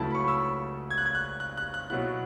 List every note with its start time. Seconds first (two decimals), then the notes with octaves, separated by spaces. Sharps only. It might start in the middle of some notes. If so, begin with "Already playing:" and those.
Already playing: C#2 C#3 F#3 A3 E4 A5
0.10 B5
0.15 C#6
0.28 E6
0.91 G#6
0.98 F#6
1.06 G#6
1.15 F#6
1.40 F#6
1.57 F#6
1.74 F#6
1.90 B2 F#3 B3 E4 F#6